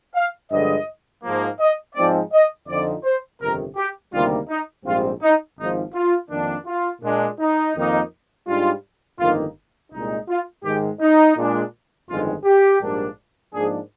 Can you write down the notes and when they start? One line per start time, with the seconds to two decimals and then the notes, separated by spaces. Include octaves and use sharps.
0.15 F5
0.50 G2 D3 F3 G#3 D#5
1.23 G#2 F3 A#3
1.60 D#5
1.95 G#2 F3 G#3 C4 D#4 D5
2.32 D#5
2.68 F2 D3 F3 C4 D#4 D5
3.04 C5
3.41 G1 F2 C3 D#3 A#4
3.77 G4
4.12 D2 C3 D#3 G3 A#3 F4
4.49 D#4
4.85 A#1 G#2 G3 C4 F4
5.22 D#4
5.57 G#1 G#2 F3 D#4
5.93 F4
6.30 F2 D#3 A#3 D4
6.66 F4
7.02 A#2 G#3 D4
7.39 D#4
7.75 F2 D#3 A#3 D#4
8.47 G#2 G3 D4 F4
9.19 G1 F2 D#3 A#3 D#4 F4
9.92 C2 A#2 G#3 D#4
10.28 F4
10.63 G#2 D#3 G#3 G4
11.00 D#4
11.36 A#2 G#3 D4
12.09 G1 F2 D#3 G#3 F4
12.44 G4
12.81 A#1 G#2 G3 A#3 D4
13.53 G#2 F3 A#3 D4 G#4